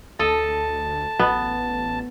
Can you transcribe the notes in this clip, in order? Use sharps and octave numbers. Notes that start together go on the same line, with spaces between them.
D2 A4 D#5 A5
A1 B3